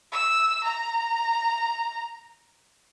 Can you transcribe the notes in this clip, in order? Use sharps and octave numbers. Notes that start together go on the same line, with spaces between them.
E6
A#5